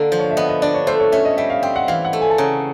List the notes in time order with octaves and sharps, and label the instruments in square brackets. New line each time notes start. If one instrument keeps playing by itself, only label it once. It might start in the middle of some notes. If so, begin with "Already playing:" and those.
Already playing: [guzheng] D3 A#3
F3
[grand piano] C#5
E5
[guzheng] B3 [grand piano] D#5
[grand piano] D#5
[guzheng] D4 [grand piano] D5
[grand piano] C#5
[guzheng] A3 [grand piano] C5
[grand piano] C#5
[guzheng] C#4 [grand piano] E5
[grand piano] D#5
[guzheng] G3 [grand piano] E5
[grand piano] F5
[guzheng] C4 [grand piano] G5
[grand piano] F#5
[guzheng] E3 [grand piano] F5
[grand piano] F#5
[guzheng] A3
[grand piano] G#5
A5
[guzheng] C#3 [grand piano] A#5